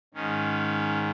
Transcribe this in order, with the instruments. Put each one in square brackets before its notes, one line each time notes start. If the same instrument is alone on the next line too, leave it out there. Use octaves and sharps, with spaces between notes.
[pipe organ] G#2 D#3 C#4